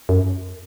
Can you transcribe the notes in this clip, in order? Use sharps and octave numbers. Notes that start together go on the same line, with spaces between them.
F#2